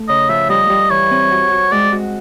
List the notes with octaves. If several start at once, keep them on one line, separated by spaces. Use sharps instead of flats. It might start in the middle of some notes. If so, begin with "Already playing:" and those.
Already playing: A3
C#3 D#5
F3 E5
G3 D#5
G3
E3 C#5
C4
F#4
F#4
G#3 D5
F#4